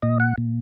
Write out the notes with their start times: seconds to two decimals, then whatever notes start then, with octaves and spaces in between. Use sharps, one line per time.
0.02 A#2 D#5
0.20 F#5
0.38 A#2